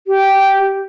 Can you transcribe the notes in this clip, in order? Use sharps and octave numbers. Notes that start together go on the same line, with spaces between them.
G4